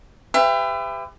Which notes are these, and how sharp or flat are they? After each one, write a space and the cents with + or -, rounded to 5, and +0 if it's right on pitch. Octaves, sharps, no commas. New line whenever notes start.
G4 +30 B4 +35 E5 +30